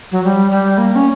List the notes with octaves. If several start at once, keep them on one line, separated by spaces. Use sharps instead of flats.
F#3
G3
G3
A#3
C#4